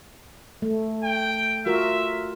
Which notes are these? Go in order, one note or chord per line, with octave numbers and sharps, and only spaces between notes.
A3
G5
F4 F#4 A#4 E5